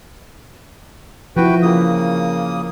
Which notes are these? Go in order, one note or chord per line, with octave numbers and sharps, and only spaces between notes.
F3 E4 F#4 B4 G5
C#3 A#3 D#6